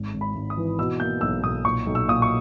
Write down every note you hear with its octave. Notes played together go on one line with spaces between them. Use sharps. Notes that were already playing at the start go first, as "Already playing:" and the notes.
Already playing: G#1
G#1
B5
G#1
D#6
E3
B2 E6
A#3 G6
B1 E6
B1 D#6
A#2 C#6
B1
E6
A#2 D#6
C#6